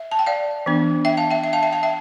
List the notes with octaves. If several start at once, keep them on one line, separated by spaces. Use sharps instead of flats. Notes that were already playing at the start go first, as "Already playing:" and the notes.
Already playing: E5
A5
G5
D5 F5
E3 B3 D4
E5 G5
F5 A5
E5 G5
E5 G5
F5 A5
E5 G5
F5 A5
E5 G5